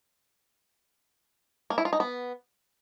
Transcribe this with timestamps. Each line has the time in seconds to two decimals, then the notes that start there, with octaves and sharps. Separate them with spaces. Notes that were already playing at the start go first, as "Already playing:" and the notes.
1.70 A#3
1.78 E4
1.85 F4
1.93 D#4
2.00 B3